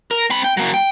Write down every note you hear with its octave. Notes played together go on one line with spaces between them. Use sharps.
A#4
C4 B5
G5
F#3 A#3
G5